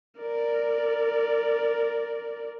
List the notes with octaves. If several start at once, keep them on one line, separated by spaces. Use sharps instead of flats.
A#4 D5